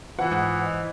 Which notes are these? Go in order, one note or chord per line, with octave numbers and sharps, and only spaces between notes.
E3 F4 B4 C5 F#5
G#2 D#6 G6
C5 D#5